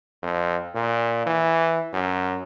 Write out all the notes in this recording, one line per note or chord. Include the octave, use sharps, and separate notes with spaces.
F2
A#2
E3
F#2